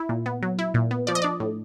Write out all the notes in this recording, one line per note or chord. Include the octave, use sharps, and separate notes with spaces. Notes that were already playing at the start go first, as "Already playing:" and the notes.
Already playing: E4
A#2
B3
F#3
E4
A#2
B3
F3 D5
D#5
D4 D5
A2